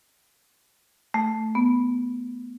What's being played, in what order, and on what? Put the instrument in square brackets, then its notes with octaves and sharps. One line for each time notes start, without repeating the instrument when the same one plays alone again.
[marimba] A3
B3